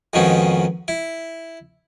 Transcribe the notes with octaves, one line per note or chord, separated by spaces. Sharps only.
F2 G#2 B2 D#3 C#4 D#4
E4